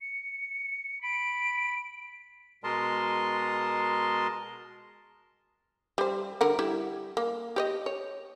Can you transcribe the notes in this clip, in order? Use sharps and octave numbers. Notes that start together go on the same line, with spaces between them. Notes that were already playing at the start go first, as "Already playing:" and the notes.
C#7
B5 D7
B2 G#3 A#4 D#5 A5 C6
G3 C5
D3 A#4 F#5
G3 E4
A#3
G4 C#5 D#5
C#5